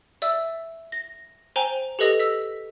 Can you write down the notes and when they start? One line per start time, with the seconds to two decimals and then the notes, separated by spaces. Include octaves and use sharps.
0.22 D5 E5 E6
0.92 A#6
1.56 C5 G5 G#5 A#5 G7
1.99 G4 A4 B4 D#5 D#6 A#6
2.19 E6 B6